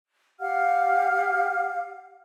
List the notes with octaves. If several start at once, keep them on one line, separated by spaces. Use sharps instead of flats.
G4 F5 F#5 F6